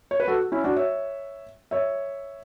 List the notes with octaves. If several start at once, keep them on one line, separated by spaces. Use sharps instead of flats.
C#5
B4
F#4 A4
C#4 E4
D4 F#4
C#5 E5
C#5 E5